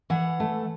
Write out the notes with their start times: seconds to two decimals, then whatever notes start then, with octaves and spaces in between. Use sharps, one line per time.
0.10 E3 F#5
0.40 A3